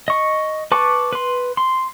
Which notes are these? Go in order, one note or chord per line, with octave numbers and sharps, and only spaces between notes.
D#5 C#6
B4 A5 C#6 D6
B4 C6
C6